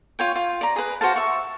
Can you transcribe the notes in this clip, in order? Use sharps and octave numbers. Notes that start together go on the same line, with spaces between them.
F4 C#5 G5
F4
D5 A#5
G#4 B4
F#4 C5 F5 A5
E5 C#6